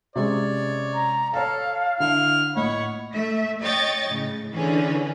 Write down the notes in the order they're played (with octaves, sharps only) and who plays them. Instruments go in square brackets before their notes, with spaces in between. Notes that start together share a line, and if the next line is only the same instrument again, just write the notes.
[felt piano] C3 G#3 C#4 [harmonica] C#5 D5
[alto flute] A#5
[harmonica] A4 [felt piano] C#5 A5 [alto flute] F5
[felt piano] D3 [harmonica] E4 F6
[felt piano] A#1 A2 D#5 [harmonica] C#5 F#5 B5
[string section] A3 E5
C#5 D#5 G5 C#6 G#6 A6
A2 C#3
D3 E3 C#4 G#4 B4 C#5